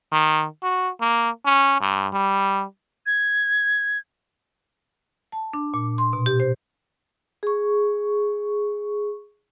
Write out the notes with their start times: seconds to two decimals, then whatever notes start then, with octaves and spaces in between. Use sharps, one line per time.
0.12 D#3
0.63 F#4
1.01 A#3
1.46 C#4
1.81 G2
2.13 G3
3.06 G#6
5.32 A5
5.53 D4
5.74 A#2
5.98 C6
6.13 B2
6.26 G4
6.40 C5
7.43 G#4 C#6